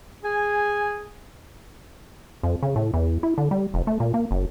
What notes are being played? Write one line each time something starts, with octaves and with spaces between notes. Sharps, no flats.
G#4 G#5
F2
C#3
A2
E2
E4
D3
G3
F1
A3
A#2
A#3
F#1